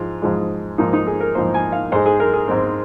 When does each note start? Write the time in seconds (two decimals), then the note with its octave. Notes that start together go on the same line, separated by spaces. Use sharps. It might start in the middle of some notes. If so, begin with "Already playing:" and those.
Already playing: G#2 F3 G#3 F4
0.22 G#2 F3 G#3
0.78 G#2 F3 A#3 D#4
0.93 D#4
1.07 G#4
1.21 A#4
1.35 G#2 F3 A#3 C5
1.54 G#5
1.72 F5
1.92 G#2 G#3 C5
2.06 G#4
2.20 A#4
2.34 G#4
2.48 G#2 G#3 C4